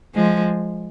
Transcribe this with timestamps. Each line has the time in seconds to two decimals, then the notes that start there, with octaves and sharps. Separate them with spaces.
0.15 F3 G#3